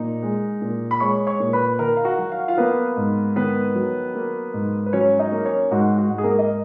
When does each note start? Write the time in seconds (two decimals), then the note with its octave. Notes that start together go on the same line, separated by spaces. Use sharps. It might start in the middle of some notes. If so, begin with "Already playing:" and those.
Already playing: A#2 D#4
0.23 G#3
0.61 A#2
0.91 B5
1.00 G#3 C#5 C#6
1.27 C#5 C#6
1.40 A#2
1.53 B4 B5
1.79 D#3 A#4 A#5
1.97 F5
2.05 F#4 F#5
2.19 F#3
2.32 F5
2.40 F#5
2.48 F4 F5
2.57 A#3 B3 B4
2.97 G#2
3.36 D#3 B3 B4
3.75 F#3
4.15 A#3
4.54 G#2
4.86 B4
4.93 F#3 C#4 C#5
5.19 D#4 D#5
5.32 A#3
5.45 C#4 C#5
5.71 G#2 F#4
5.98 F#4
6.11 G#2
6.18 G#4
6.23 A#3 A#4
6.39 D#5